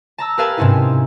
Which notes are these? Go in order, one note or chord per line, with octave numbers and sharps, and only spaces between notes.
A5 A#5 E6
G4 A#4 B4 F5 G#5 A5
G#2 C3 C4 C#4 D#4 E4